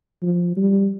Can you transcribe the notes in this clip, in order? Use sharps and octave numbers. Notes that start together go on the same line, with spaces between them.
F3
G3